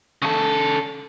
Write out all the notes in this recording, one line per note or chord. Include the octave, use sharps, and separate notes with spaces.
C#3 A4